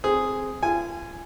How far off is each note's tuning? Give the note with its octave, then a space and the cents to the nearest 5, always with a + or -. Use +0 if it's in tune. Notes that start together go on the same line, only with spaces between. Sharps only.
C4 +0 G#4 +0
F4 -35 G#5 -5